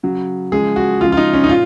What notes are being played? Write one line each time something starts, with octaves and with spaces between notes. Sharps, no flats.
C#3 F#3
C#3 F3 G#3 G#4
F#4
C#3 F3 G#3 F4
F4
D#4
C#4
D#4
A#2 F4